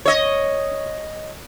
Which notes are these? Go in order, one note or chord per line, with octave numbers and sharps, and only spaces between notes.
C#5 D#5